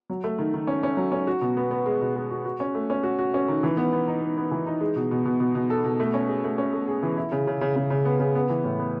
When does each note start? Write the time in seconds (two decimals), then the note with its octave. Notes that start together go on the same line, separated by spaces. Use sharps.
0.10 F#3
0.24 A3
0.39 D#3
0.54 D#3
0.67 C#4
0.83 C#4
0.97 F#3
1.12 C#4
1.27 F#4
1.41 B2
1.57 B3
1.71 B3
1.86 G#3
2.01 B2
2.16 G#3
2.30 F#4
2.45 F#4
2.60 C#4
2.75 A3
2.90 C#4
3.03 F#4
3.19 F#4
3.34 C#4
3.48 D#3
3.63 E3
3.77 B3
3.93 B3
4.08 D#4
4.21 B3
4.37 B3
4.51 E3
4.66 D#4
4.81 G#3
4.96 B2
5.11 B2
5.25 B2
5.40 B2
5.55 B2
5.70 A4
5.84 B2
6.00 A3
6.14 C#4
6.28 G#4
6.44 A3
6.58 C#4
6.73 A3
6.88 G#4
7.03 E3
7.17 E4
7.32 C#3
7.47 C#3
7.61 C#3
7.76 C#3
7.90 C#3
8.05 B3
8.20 C#3
8.35 B3
8.50 E3
8.64 A2
8.79 B3